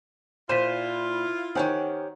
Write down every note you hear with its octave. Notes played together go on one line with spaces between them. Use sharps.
A#2 E4 F4 C5 B6 D#7 E7
D#3 C#4 G4 C5 C#5 F#5 G#5